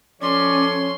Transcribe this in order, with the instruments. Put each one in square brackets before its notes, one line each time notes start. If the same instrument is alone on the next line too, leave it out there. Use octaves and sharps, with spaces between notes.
[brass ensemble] F3 A4 C#5 [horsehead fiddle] C#4 [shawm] D5 [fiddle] C6